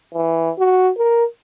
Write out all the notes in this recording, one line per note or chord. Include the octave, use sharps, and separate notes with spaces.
E3
F#4
A#4